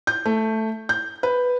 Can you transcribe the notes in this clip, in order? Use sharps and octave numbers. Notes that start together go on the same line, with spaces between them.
G6
A3
G6
B4